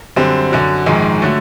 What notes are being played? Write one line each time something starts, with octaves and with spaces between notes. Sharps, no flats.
F#2 D3 G3 C4
F#2 D3 F#3
A#1 G#2 D#3 G#3
D3 F#3 A3